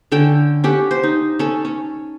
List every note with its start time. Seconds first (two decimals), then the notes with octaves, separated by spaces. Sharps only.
0.12 D3 C#4 A4 G5
0.64 C#4 G4 A4 F#5
0.91 C5
1.03 D#4
1.39 C#4 A4
1.65 C#4